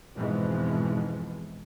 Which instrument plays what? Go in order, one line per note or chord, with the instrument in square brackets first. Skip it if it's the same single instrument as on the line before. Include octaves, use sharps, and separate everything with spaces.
[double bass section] F2 G#2 B2 E3 F3 G#3